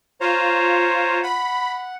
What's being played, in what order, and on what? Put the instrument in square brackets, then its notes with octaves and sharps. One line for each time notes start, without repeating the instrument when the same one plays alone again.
[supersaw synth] F4 [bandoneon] C5 C#5 A#5
[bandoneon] F#5 [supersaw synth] B5